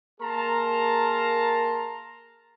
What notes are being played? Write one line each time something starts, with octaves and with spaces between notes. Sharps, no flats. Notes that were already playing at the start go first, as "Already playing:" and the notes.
A#3 G#4 A#4 A5 A#5 C6